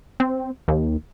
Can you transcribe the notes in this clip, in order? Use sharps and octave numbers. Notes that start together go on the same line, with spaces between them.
C4
D#2